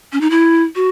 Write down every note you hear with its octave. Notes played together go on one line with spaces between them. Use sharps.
C#4
D#4
E4
F#4